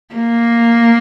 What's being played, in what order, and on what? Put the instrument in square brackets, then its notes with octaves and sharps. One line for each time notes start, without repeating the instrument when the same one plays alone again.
[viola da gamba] A#3